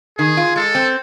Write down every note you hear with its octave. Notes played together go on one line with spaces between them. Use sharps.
D#3 G#4
F4
G#3 A4
C4